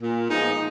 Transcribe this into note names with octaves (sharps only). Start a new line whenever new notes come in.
A#2
F3 G#3 B3 D#4